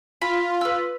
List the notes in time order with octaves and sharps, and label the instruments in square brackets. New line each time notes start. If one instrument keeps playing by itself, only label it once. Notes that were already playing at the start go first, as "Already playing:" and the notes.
[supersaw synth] F4 [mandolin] B5
[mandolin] B4 E6